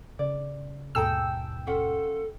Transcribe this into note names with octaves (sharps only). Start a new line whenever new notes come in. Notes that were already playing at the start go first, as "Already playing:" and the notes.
C#3 D5
D#2 G#2 B2 G#4 A4 G5 A#5 E6
C#4 F4 A4 F#5